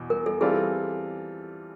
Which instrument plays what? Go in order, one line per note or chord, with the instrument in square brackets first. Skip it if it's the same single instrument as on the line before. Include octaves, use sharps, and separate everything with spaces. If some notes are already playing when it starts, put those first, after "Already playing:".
Already playing: [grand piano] E2 B2
[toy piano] A#4
A4
[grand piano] E3 G3 C4 F4 A4 [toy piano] G#4